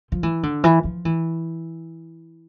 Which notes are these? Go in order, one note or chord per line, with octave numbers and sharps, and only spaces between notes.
F3
E3
D3
E3
F3
E3